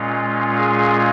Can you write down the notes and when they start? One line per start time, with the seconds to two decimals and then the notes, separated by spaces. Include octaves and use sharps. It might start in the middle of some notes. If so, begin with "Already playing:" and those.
Already playing: A#2 G#3 C#4 F4
0.57 G#4